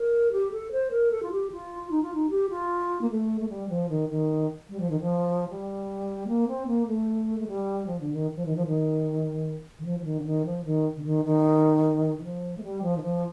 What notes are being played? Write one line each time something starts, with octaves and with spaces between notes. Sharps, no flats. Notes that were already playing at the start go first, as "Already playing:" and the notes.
Already playing: A#4
G4
A4
C5
A#4
A4
F4
G4
F4
D#4
F4
D#4
G4
F4
A#3
A3
A3
G3
F3
D#3
D#3
G3
F3
D#3
F3
G3
A#3
C4
A#3
A3
A3
G3
F3
D3
D#3
F3
D#3
F3
D#3
D#3
F3
F3
D#3
D3
D#3
F3
D#3
D3
D#3
D#3
D#3
F3
A3
G3
F3
D#3
F3